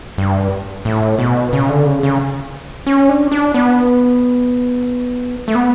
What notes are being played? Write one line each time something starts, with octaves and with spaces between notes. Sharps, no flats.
G2
A2
B2
C#3
D3
C#3
C#3
C#4
D4
D4
B3
A3
B3